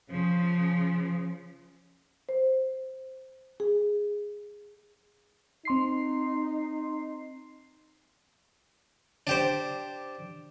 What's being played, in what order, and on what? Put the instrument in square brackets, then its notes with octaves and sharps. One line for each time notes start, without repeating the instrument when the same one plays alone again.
[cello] C#3 F3
[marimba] C5
G#4
[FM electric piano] C4 C6 C7 [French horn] D#4
[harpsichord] D4 G4 C5